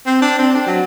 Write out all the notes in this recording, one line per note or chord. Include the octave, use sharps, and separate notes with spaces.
C4
D4
C4
D4
F#3